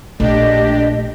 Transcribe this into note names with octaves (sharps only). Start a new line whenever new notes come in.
A#1 A3 D4 G4 D#5